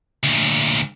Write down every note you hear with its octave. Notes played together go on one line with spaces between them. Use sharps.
D2 A#2